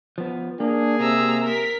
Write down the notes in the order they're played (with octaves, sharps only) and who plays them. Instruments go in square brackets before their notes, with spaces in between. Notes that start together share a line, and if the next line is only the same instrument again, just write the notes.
[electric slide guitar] F3 B3
[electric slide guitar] A#3 [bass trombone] D4 [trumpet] G#4
[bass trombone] C3 [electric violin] A#5 E6
[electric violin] A#4 B6